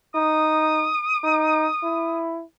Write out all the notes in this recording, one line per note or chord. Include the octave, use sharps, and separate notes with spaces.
D#4 D#6
D#4
E4